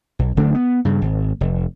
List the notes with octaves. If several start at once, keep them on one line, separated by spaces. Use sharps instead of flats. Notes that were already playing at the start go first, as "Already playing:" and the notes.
B1
D1 D3 A3 D4
B3
G2 C#3
G#1
F1